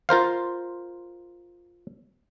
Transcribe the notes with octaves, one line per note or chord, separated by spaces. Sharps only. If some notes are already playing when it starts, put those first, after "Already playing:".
F4 A#4 C5 F5